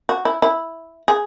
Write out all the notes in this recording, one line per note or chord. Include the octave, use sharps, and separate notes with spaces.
F#4
E4
E4
G#4